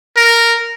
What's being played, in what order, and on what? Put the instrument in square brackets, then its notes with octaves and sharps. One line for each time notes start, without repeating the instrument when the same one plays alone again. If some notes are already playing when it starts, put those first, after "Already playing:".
[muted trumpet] A#4